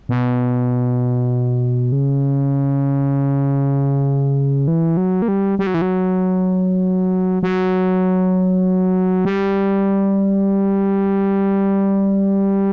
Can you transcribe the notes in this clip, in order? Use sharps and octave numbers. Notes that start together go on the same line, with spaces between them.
B2
C#3
E3
F#3
A#3
G3
G3
F#3
E3
F#3
F#3
G3